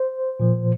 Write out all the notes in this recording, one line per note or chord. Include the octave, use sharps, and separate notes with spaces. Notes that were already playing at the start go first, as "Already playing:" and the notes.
Already playing: C5
A#2 F3